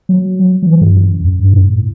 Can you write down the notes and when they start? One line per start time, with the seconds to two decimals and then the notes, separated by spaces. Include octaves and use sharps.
0.09 F#3
0.62 F#3
0.67 E3
0.81 G2
0.96 F#2
1.24 F#2
1.39 G2
1.53 A2